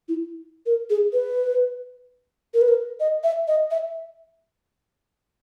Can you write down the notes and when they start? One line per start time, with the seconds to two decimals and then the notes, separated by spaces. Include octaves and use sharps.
0.09 E4
0.66 A#4
0.90 G#4
1.13 B4
2.54 A#4
2.61 B4
2.68 A#4
3.00 D#5
3.24 E5
3.48 D#5
3.71 E5